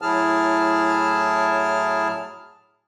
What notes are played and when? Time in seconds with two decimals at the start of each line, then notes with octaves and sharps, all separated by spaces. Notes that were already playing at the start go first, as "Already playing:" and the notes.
0.02 A2 F#3 E4 G#4 A5 F6